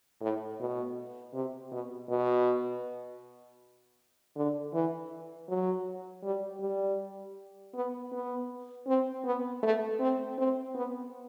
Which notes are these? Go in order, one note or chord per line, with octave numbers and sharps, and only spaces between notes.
A2
B2
C3
B2
B2
D3
E3
F#3
G3
G3
B3
B3
C4
B3
A3
C4
C4
B3